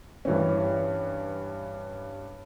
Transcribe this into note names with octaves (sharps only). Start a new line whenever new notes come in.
G2 E3 C#4